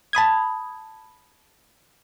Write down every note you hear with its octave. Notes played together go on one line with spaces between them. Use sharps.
A5 B5 D#6 G#6